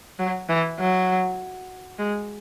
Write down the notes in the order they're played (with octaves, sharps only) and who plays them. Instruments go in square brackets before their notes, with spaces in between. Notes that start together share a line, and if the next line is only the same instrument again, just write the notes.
[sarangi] F#3
E3
F#3
G#3